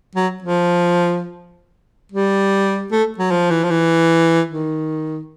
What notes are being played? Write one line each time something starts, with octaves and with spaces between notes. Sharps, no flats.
F#3
F3
G3
A3
F#3
F3
E3
F3
E3
D#3